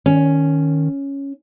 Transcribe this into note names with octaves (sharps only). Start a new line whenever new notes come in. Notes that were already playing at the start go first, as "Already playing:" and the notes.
D#3 C#4